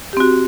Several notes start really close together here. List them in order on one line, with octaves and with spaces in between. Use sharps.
G4 C4 F#4